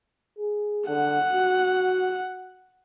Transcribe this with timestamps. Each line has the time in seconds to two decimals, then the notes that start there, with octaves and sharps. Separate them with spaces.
0.38 G#4
0.88 D3 F#5
1.33 F#4